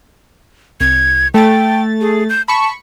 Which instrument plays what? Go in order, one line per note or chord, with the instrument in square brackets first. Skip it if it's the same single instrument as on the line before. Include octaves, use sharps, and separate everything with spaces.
[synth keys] C2 [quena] G#6
[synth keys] A3 A6 [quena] G5
[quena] G#4
G6
[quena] A5 [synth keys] B5 C#6